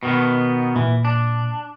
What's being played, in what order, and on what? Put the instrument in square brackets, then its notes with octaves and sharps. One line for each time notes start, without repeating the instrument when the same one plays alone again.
[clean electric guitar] B2 D#3 B3
[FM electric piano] A#2 [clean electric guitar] E3
[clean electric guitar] D4